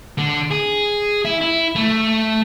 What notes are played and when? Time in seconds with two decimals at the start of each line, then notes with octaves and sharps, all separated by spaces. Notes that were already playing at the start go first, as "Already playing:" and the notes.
0.18 D3
0.51 G#4
1.25 E4
1.41 E4
1.75 A3